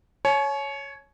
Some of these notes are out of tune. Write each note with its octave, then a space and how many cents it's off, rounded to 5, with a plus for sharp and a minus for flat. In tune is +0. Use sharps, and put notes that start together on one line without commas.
C#5 +0 G#5 +45